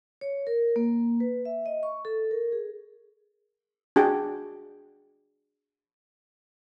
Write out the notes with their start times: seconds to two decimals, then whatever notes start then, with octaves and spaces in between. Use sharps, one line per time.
0.21 C#5
0.47 A#4
0.76 A#3
1.20 B4
1.45 E5
1.66 D#5
1.83 C#6
2.05 A4
2.31 A#4
2.52 G#4
3.96 D4 F#4 G#4 G5